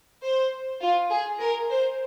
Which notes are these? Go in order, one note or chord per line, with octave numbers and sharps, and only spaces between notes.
C5
F4
G#4
A#4
C5